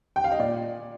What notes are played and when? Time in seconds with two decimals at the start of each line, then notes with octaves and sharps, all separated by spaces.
0.16 G5
0.24 F5
0.32 D#5
0.39 A#2 D5